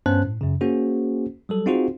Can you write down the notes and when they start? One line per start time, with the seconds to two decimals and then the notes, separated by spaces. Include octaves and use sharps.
0.06 G2 B3 C#4 C5 A5 F#6
0.25 A2
0.41 F#2 C#3
0.61 A#3 C#4 F#4 G#4 C5
1.49 F#3 G3 A4
1.66 C4 D#4 F4 F#4 G#4 C5